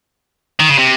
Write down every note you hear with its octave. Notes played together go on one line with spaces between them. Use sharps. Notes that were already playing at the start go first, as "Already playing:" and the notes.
D#3
C#3
C3